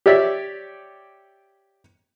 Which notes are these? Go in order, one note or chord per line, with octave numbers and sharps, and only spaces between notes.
G4 C#5 D5 E5